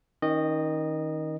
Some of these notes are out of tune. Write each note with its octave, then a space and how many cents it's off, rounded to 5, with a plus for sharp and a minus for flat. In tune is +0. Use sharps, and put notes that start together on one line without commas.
D#3 +20 C#4 +0 D#5 -15